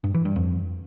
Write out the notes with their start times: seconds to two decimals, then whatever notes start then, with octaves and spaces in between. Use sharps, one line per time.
0.04 G2
0.14 E3
0.25 G2
0.36 F2